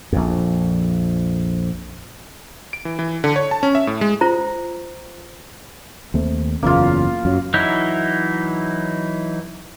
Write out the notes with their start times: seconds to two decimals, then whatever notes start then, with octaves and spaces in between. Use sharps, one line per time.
0.13 A#1 F2
2.73 D7
2.85 E3
2.99 E3
3.24 D3
3.36 C#5
3.51 A5
3.63 C#4
3.75 E5
3.87 A2
4.01 G#3
4.21 F4 C5 A#5
6.14 D#2 A3 C4
6.63 F#1 E2 C#3 A#3 F4
7.25 F#2 F#3
7.54 E3 F#3 D#4 E4